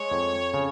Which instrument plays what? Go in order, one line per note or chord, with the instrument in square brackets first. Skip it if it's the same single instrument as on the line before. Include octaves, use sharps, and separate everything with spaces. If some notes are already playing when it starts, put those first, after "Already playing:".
Already playing: [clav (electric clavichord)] G#3 [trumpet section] C#5
[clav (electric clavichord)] F2
C#3